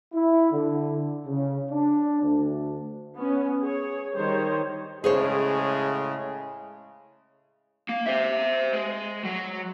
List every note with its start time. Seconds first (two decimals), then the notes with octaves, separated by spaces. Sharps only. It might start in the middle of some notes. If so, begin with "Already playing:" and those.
0.13 E4
0.52 D3
1.26 C#3
1.71 D4
2.23 D2
3.16 B3 C#4
3.61 G#4 C#5
4.16 D#3 G3 C5 C#5
5.04 A2 C#3 G#3 G#4 C5 C#5
7.89 A#3
8.07 C5 E5
8.73 G#3
9.24 F#3